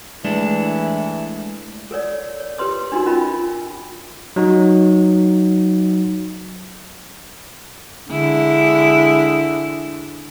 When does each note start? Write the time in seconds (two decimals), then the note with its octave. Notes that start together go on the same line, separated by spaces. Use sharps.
0.25 E3 G#3 A3 D4
1.91 A4 A#4 C#5 D5
2.40 C#5
2.58 G4 A#4 B4 C6 D#6
2.92 D4 D#4 F#4 A#4
3.06 C#4 F4 A#4 D#5 B5
4.36 F#3 D#4 F#4
8.10 D3 G#3 E4